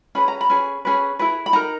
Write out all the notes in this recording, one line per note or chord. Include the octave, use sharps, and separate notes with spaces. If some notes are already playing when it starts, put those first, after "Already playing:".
C#4 G#4 B4 B5
A#5
B5
C#4 G#4 B4
C#4 G#4 B4
E4 G#4 B4
B5
D#4 A#4 A#5